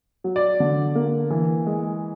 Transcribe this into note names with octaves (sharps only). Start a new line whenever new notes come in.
F#3
D5
D3
A#3
E3
G#3